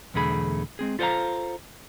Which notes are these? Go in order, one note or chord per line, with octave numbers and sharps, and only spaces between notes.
B1 E2 D3 A3 G#4 B5
G#3 C4 G#4
F4 A4 C5 D5 F5 A#5